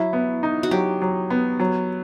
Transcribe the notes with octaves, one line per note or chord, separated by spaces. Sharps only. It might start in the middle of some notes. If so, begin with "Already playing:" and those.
Already playing: F#3 E4
B3
D#4
F#4
F#3 G4
F#3
B3
F#3